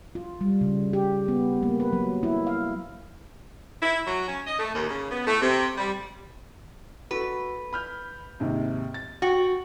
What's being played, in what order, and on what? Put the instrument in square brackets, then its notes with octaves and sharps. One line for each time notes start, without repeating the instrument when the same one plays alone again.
[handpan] F4
G3
C#3
G4
B3
A#3
B4
F#3
E4
F5
[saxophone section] E4
F#3
C#4
D#5
A3
D#2
C#3
B3
A3
C3
G3
[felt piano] F#4 A4 [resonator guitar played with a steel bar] B4
[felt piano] B5 F6 G6
D#2 G#2 C3
A6
[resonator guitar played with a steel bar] F#4 [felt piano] G5